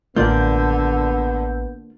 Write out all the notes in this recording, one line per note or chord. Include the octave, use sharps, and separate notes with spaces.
A1 D3 A#3 B3 F4 D5 G6